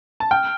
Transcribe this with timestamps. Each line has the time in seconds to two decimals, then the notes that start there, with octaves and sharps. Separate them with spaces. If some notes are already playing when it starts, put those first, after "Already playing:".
0.20 A5
0.31 G5 F6